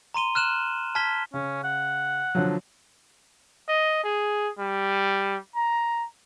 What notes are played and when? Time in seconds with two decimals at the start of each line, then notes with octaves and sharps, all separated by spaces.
0.14 A#5 C6 D#7 G7
0.35 F6 F#6 E7 F#7
0.95 A5 F6 G#6 B6 G7
1.34 C#3 C#4
1.64 F#5
2.35 D3 F3 F#3
3.68 D#5
4.04 G#4
4.59 G3
5.55 A#5